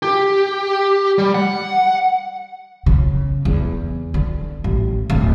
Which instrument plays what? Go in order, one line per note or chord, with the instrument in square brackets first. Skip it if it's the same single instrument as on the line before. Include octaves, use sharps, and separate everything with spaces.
[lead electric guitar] G4
G3
F#5
[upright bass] C#3
E2
D3
A1
D1